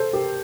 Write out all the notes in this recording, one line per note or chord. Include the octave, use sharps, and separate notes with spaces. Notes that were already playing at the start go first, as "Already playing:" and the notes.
Already playing: A4 C5
G4 A#4